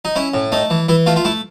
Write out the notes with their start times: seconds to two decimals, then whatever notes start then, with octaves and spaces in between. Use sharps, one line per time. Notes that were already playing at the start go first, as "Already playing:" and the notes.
0.05 D#4
0.16 C#4 E4
0.34 A2
0.52 A3 D#4
0.70 E3
0.89 E3 E4
1.06 A3 F4
1.16 F4
1.25 A3 E4